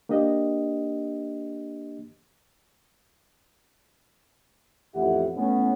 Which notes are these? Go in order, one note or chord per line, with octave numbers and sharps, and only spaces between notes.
A#3 D4 G4 D#5
A1 F2 A2 E4 G4 F#5
A2 B3 C#4